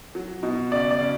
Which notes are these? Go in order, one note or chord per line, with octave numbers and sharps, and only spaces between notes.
F#3
B2
C#3 D5
D5
C#3